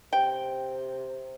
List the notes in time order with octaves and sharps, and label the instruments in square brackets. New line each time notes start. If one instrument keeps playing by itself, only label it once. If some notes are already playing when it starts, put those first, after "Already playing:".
[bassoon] C3 [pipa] G5